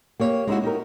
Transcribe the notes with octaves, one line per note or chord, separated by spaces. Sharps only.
A#3 G4 C#5
G#3 D#4 E4 F#4
D#4 G4 A#4